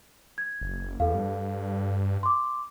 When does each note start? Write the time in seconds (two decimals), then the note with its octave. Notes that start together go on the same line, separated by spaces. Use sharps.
0.38 G#6
0.61 F#1
1.00 E2 A4 F5
1.15 G2
2.23 C6 D6